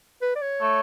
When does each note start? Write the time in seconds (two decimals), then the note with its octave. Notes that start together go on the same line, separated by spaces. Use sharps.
0.22 B4
0.36 D5
0.42 C#5
0.61 A3